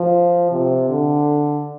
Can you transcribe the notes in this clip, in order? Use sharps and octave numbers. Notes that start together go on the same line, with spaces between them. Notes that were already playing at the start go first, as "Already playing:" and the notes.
Already playing: F3
C3
D3